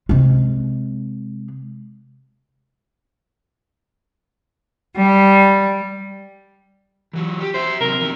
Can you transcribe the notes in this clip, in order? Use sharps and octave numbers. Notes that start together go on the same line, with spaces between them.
C3 G#3
G3
E3 F#3
G4
F#4 C5 E5
C3 F#3 A#4
F2 D#3